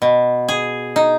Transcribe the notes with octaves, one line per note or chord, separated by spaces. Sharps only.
B2
G#4
D#4